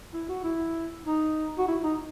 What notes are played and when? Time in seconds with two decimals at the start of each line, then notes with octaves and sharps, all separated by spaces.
0.13 E4
0.29 F#4
0.44 E4
1.06 D#4
1.58 F#4
1.68 E4
1.83 D#4